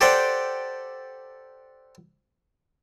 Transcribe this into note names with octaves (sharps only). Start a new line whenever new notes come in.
G4 A4 C5 D5 F#5 G5